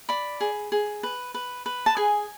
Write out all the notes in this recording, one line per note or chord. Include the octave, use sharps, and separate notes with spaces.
D5 B5
G#4
G#4
B4
B4
B4
A5
G#4 G#5